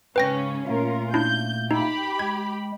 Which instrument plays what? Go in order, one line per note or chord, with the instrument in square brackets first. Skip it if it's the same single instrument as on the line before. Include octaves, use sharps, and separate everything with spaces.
[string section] G#2 C#3 C#4 [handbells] B4 G5 A#6
[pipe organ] A#2 A3 A#3 [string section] C#4 F4 A#4
[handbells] D4 E4 [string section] G6
[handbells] D#4 [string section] G4 B5
[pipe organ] G#3 [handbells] G#6